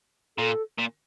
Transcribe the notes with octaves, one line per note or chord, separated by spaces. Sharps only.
A#2 A4
A#2